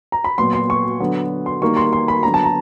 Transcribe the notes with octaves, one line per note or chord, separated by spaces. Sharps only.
A#5
B5
A#2 F#3 B3 C6
C6
C#6
D3 F#3 B3
C6
D#3 G3 A#3 C#6
C6
C6
B5
D3 F#3 B3 A#5
A5
A#5